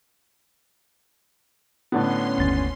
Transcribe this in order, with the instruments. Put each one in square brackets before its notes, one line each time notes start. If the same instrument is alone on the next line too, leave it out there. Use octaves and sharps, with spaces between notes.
[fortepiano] A2 D3 B3 [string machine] C#4 C6
[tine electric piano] G1 D#2 A6